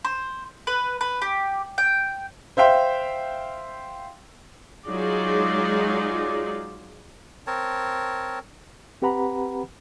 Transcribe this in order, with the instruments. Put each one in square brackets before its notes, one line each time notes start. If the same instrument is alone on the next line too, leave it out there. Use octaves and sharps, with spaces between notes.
[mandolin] C5
B4
B4
G4
G5
[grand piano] C5 E5 F5 G5 C6
[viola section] F#3 G#3 D#4 F4 G#4 D5
[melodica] C4 A#4 C#5 A5
[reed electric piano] C4 G4 B4 F#5 A#5 B5